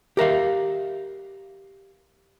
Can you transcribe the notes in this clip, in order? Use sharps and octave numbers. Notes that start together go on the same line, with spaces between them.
G4 A#4 E5 F5